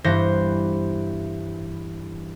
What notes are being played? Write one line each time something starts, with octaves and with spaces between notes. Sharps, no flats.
G2 E3 B3 C5 A#6